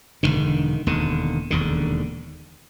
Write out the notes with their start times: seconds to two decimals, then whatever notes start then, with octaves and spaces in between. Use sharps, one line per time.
0.23 E1 D#2 D3 D#3
0.86 E1 D#2 D3
1.50 E1 D#2 D3